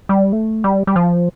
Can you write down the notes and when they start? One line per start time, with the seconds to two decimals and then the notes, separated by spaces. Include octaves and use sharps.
0.09 G3
0.33 A3
0.64 G3
0.87 G3
0.96 F3